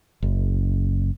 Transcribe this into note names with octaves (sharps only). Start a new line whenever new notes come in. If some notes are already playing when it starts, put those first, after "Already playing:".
F#1